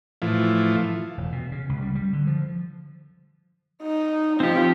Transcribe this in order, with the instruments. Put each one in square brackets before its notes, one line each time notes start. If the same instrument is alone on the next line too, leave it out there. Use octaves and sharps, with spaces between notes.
[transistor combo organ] A2 E3 F3
[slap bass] E1
B2
C#3
C#2
G3
G3
D3
F3
[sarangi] D#4
[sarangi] F3 [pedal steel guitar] C4 G4